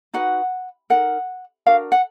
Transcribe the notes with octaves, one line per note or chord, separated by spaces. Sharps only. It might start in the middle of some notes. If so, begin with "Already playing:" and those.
D#4 F#4 B4 F#5
D#4 A#4 F#5
D4 F#4 A#4 F5
F#5